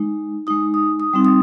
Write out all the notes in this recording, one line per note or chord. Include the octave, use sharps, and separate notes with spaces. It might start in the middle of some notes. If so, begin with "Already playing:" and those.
Already playing: G#3 D#4
G#3 D#4 D#6
D#6
D#6
G3 C4 D#4
D#6